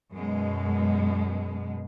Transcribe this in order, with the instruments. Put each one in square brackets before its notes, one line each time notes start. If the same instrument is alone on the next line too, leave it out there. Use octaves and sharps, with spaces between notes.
[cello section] F#2 B2 G#3